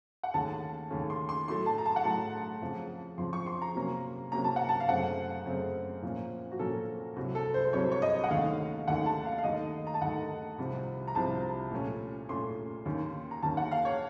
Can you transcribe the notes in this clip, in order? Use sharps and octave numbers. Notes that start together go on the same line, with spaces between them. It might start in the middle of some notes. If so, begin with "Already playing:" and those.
F#5
D#2 C#3 A3 C#4 A5
D#2 C#3 A3 C#4
C6
C6
A2 F#3 A3 C6
A5
A#5
A5
F#5
A2 F#3 A3 A5
F2 C#3 F3
F2 C#3 F3 C6
C#6
C6
A#5
C3 F#3 A#3 C#4
C3 F#3 A#3 C#4 A#5
A5
F#5
A5
F5
F#2 C#3 A3 C4 F#5
F#2 C#3 A3 C4
A#2 F3 A#3 C#4
F#4
A#2 F3 A#3 C#4 A4
C2 C3 F#3 F#4
A4
C5
C5
C2 C3 F#3 C#5
C#5
D#5
F#5
D#2 D#3 A3 C#4 F5
D#2 D#3 A3 C#4 F#5
A5
F5
F5
D#2 D#3 A3 D#5
A#5
A5
D#2 D#3 A3 F#5
C2 C3 F3 C4
A#5
C2 C3 F3 C4 A5
A#2 A3 C#4
A#2 A3 C#4 C6
D#2 D#3 A#3 C#4
A#5
D#2 D#3 A#3 C#4 A5
F#5
F5
C#5